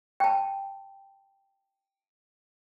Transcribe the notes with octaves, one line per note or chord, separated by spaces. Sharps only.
G5 A5